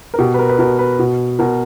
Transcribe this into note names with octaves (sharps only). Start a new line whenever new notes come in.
A#4
B2 G4
B4
A#4
B4
B2 A#4
B4
B2
B2 A#4